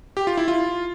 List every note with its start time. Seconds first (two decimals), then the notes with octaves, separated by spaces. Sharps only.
0.17 G4
0.27 F4
0.37 E4
0.48 F4